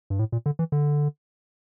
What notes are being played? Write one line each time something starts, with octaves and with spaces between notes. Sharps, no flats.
G2
A2
A#2
D3
E3
D3